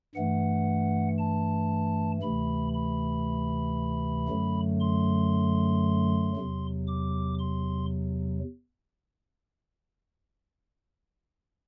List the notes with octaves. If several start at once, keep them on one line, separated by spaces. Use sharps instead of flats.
G2 E3 A3 F#5
A5
D2 C3 E3 A3 B5
B5
F#2 D3 F#3 A3
C6
E2 C3 F#3
D6
C6